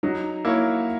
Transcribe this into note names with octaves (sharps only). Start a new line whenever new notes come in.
F#3 D#4
A#3 E4 A#4 C#5